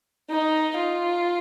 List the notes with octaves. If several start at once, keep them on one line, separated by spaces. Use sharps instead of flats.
D#4
F4